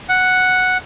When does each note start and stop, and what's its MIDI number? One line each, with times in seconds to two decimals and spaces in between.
0.09 0.78 78